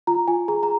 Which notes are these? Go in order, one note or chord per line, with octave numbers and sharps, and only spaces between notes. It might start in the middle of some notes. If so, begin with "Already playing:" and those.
F4 A#5
F4 G#5
G#4 A#5
A#5